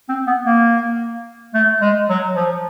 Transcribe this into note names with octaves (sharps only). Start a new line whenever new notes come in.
C4
B3
A#3
A3
G#3
F#3
F3